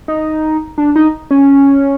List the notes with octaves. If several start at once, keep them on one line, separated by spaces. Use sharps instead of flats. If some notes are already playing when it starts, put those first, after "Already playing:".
D#4
D4
D#4
C#4